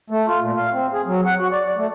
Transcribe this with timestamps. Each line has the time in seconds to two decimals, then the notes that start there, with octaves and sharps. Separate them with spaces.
0.10 A3
0.28 F4
0.42 A#2
0.57 F5
0.72 C4
0.93 G#4
1.06 F#3
1.26 F#5
1.39 F#4
1.52 D5
1.65 D5
1.77 A3